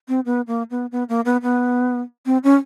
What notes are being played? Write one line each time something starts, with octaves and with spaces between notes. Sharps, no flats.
C4
B3
A#3
B3
B3
A#3
B3
B3
C4
C#4